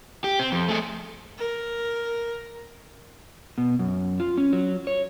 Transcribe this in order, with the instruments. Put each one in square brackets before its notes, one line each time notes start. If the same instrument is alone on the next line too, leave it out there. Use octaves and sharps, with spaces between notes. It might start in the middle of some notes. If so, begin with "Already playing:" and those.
[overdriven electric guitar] G4
C4
F2
A3 G#4
[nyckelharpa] A#4
[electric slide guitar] B2
F#2
F4
C#4
F#3
C#5